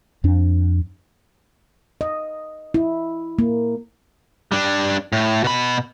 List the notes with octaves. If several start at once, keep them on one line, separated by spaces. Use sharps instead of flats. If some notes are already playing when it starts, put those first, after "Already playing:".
F2 D4
D#5
E4
A#3
G3 D4
A2
B2 B5